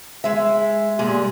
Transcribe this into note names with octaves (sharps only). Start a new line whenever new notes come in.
G#3 E5
A#2 G3 G#3 G#4